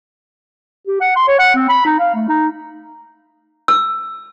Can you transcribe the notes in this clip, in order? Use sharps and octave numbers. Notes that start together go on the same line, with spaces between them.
G4
F#5
C6
C#5
F#5
C4
B5
D#4
F5
A3
D#4
E6